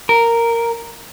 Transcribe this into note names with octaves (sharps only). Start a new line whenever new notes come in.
A#4